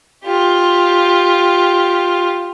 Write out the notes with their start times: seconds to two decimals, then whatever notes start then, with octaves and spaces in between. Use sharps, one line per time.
0.25 F4 G4